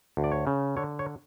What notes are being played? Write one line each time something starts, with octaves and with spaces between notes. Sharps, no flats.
D2
D5
C#5
C#3
D3 C#5
C#5